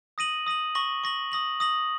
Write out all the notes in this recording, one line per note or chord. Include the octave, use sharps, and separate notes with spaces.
D#6 A#6 D#7 F#7
D#6 A#6 D#7 F#7
C#6 A#6 F#7
C#6 A#6 F#7
D#6 A#6 F#7
D#6 A#6 F#7